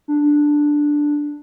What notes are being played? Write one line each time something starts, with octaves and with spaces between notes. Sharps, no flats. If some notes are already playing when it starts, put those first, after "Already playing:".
D4